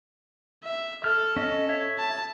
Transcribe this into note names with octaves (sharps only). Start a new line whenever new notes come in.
E5
A4 F6
C#4 D#5
C#5 E5
A5